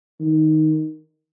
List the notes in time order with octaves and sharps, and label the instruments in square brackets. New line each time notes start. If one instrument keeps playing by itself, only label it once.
[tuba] D#3